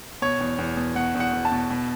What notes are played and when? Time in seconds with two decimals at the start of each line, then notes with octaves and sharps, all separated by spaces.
0.22 B2 C#5
0.40 E2
0.59 E2
0.77 B2
0.95 B2 F#5
1.15 E2
1.20 F#5
1.33 E2
1.45 A5
1.52 B2
1.70 B2